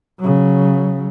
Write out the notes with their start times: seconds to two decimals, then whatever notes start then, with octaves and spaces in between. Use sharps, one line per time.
0.20 C#3 F#3